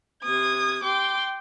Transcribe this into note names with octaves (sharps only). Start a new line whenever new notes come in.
C3 D#6 G#6
G5 C6 D6